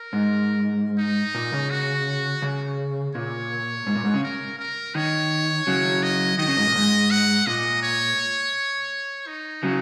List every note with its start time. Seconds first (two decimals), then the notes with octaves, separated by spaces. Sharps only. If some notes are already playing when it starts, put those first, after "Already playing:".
Already playing: A#4
0.13 G#2
0.98 D#4
1.35 A#2
1.52 C#3
1.70 F#4
2.42 C#3
3.15 A#2 C#5
3.87 G#2
3.95 A#2
4.05 G#2
4.14 C#3
4.23 A#4
4.59 A#4
4.95 D#3 C#5
5.67 C#3 F#3
6.03 D#5
6.38 D#3 D#5
6.47 C#3
6.57 G#2
6.66 A#2
6.75 G#2
7.11 F#5
7.46 A#2 D#5
7.83 C#5
9.27 D#4
9.63 C#3 F#3